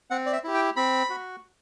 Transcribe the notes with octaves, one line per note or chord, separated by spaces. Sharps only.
C4 F#5
D5
E5
E4 G4
G5
C4 B5
F#4